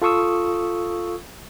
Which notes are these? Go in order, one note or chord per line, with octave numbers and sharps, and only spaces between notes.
F4 A4 F5 C#6 D#6 E6